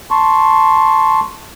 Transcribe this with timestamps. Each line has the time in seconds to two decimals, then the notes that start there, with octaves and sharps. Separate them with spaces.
0.11 A5 C6 C#6